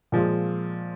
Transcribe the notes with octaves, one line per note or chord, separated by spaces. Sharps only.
A#2 F3 G#3